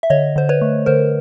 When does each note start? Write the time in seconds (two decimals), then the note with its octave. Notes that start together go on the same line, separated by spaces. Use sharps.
0.03 E5
0.10 D3 C#5 D#5
0.36 D3 C5
0.49 B4 C#5
0.61 A3
0.86 D3 A#4 C5